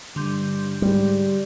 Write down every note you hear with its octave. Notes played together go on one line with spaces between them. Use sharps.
G2 D3 C6 G6
G#2 G3